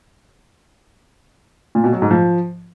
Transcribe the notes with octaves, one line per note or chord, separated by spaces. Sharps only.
A#2
B2
F#3
G#2
F3